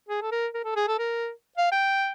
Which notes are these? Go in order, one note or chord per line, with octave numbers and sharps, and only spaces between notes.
G#4
A4
A#4
A#4
A4
G#4
A4
A#4
F5
G5